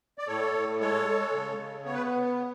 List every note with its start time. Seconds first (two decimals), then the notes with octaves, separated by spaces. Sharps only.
0.18 D5
0.27 A2 A4 C#5
0.55 A2
0.80 G#3 A4 C#5
1.07 G#3
1.32 C#3
1.58 C#3
1.85 B3 C#5
1.93 B4